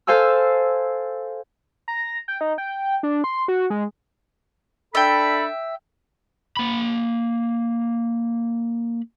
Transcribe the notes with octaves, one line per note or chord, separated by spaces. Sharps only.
A4 C5 F5 G#5 E6
A#5
G5
D#4
G5
D4
C6
F#4
G#3
D4 A4 E5 G5 B5
A#3 B5